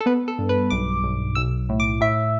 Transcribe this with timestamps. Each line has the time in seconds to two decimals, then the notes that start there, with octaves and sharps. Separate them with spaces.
0.01 A4
0.06 B3 B4
0.28 A4
0.38 G2
0.49 B4
0.70 B1 D6
1.03 B1
1.35 B1 E6
1.69 A2
1.80 D6
2.01 A2 E5